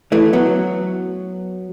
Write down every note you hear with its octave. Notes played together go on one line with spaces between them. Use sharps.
E3 A3
F#3 B3